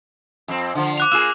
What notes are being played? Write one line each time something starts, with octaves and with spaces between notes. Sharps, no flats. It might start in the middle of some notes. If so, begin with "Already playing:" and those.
F2 C4
D3 F3
D6 F#6 F7
A#3 F4 G#4 E6 F#6 E7